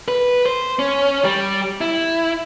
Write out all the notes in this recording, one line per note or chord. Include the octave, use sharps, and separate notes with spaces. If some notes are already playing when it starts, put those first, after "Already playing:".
B4
C5
C#4
G3
E4